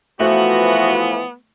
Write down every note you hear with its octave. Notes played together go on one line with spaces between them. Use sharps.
E3 F3 A3 B3 F#4